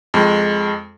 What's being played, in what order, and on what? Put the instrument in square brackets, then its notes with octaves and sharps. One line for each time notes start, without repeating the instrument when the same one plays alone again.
[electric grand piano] F2 G#3